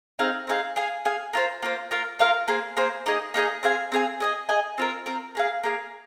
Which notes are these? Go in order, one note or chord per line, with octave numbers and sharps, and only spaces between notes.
C4 D#4 G#4 F5
C4 D#4 G#4 F5
G#4 F5 G#5
G#4 F5 G#5
A#3 F4 C5
A#3 F4 C5
A#3 F4 A#4 F5
A#3 F4 A#4 F5
A#3 G#4 C5
A#3 G#4 C5
A#3 D#4 G#4 D#5
A#3 D#4 G#4 D#5
C4 G#4 F5 G#5
C4 G#4 F5 G#5
G#4 D#5 G#5
G#4 D#5 G#5
C4 F4 A#4
C4 F4 A#4
A#3 G#4 F5
A#3 G#4 F5